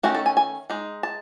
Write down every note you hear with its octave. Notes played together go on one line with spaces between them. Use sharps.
D#3 A3 C#4 F#4
A4
G#5
G#5
G#3 D#4
A5